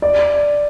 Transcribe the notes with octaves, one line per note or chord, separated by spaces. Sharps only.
D5